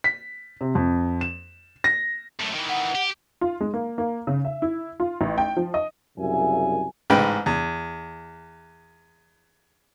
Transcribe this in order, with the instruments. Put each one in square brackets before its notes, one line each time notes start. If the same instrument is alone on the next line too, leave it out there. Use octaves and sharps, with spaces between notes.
[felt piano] B6
C3
F2
E7
A#6
[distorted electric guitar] F#2 A2
D#3 E3
[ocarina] F#5
[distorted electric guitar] G4
[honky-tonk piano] F4
G#3
A#3
A#3
C#3
E5
E4
F4
A1
G5
F3
D#5
[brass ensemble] C2 F#2 C#3 E5 G#5
[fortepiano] A1 G#2 G#3 B4 G5
E2